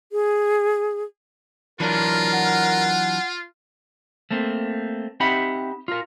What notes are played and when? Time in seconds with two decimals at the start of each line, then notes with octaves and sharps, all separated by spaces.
0.12 G#4
1.80 E3 F#3 D4 F4 A#4
2.34 F#5
4.31 A3 A#3 C4
5.20 C4 D#4 G4 E5 F#5 B5
5.88 F4 A#4